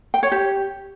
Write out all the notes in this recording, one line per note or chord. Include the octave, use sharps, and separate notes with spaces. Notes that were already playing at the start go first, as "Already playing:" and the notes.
G5
C#5
G4